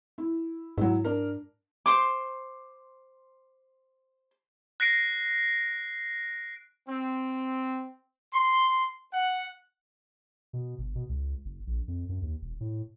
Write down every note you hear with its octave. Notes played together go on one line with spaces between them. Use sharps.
E4
G#2 F#3 E4
D4 A#4
C5 C6 D6
F#6 A#6 C7 D7
C4
C6
F#5
B2
G1
B2
C#2
F#1
A#1
F2
F#2
D#2
E1
A2